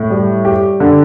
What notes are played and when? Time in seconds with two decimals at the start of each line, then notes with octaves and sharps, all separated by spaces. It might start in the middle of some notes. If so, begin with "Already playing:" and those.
Already playing: A2
0.10 G3
0.45 G4
0.80 D3